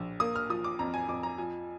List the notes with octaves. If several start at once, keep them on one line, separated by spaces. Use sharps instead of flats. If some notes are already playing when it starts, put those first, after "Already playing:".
Already playing: A#1
A#3 D#6
F6
F3 D#6
D6
F2 A#5
G#5
F2 D6
A#5
F3 G#5